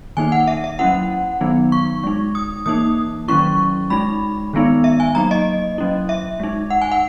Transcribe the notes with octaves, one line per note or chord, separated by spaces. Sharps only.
D#3 A#3 D#4 G#5
F#5
E5
E5
F#3 C#4 E4 F#5
D#3 F#3 B3 D#4
C#6
G#3 D#4
D#6
E3 A#3 D#4 D#6
D#3 F#3 C#4 E4 C#6
G#3 D#4 B5
D#3 G#3 B3 D#4
E5
G#5
F#3 A#3 D#4 A#5
D#5
F#3 C#4 E4
E5
G#3 D#4
F#5
G#5
F#5